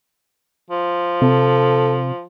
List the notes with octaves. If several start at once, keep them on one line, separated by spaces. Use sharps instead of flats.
F3
C3 A4